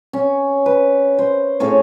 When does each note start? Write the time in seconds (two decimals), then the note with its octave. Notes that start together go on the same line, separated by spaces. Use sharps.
0.13 C#4
0.66 B4
1.19 C5
1.60 A2 C#4 G#4 C#5